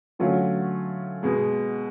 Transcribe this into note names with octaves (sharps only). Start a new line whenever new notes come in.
D3 F#3 A3 C#4 F4
B2 G#3 B3